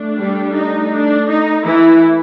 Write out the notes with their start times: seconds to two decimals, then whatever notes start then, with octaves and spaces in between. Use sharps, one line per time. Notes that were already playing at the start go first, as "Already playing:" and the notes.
Already playing: A3 D4
0.17 G3 G4
0.54 D#4
0.92 D4
1.29 D#4
1.64 E3 E4